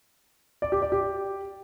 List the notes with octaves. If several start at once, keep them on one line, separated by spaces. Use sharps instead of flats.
D5
G4
D5
G4